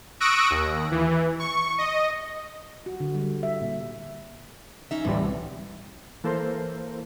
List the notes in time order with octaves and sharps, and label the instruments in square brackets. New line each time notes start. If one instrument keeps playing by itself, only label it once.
[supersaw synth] C#6 D#6 E6 F#6 A#6 D7
D#2
E3
C#6
D#5
[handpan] F#4
D3
G3
E5
A#2
[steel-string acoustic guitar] C#4 D#4 E5
[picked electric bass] D1 A1 G3 [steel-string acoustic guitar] E3
[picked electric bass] C2
[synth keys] E3 A#3 A4 A#4 C5